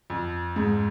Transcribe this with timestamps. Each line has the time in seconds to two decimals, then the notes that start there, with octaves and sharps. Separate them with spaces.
0.10 F2
0.56 G#2